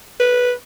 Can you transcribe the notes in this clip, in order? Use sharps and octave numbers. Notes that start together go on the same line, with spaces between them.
B4